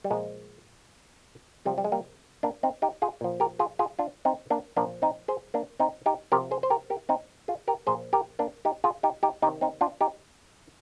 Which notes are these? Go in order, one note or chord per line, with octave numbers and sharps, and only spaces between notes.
G3
A#2 F3 G#3
C3 F3 G3
G3
G#3
G3 A#3
A#3 D4
C4 D#4
D#4 G4
F4 G#4
A#2 F3
G4 A#4
F4 G#4
F4 G#4
D4 F4
C4 D#4
A#3 D4
A#2 F3 A#3 D4
C4 D#4
G#4 C5
A#3 D4
C4 D#4
D#4 G4
C3 F3 G4 A#4
G#4 C5
C5
G4 A#4
G4 A#4
C4 D#4
F4 G#4
G4 A#4
A#2 F3 G#4 C5
G4 A#4
A#3 D4
D#4 G4
F4 G#4
D#4 G4
D#4 G4
C3 D#3 D#4 G4
C4 D#4
D4 F4
D#4 G4